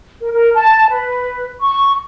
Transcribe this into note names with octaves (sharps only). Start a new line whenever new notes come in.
A#4
A#4
A5
B4
C#6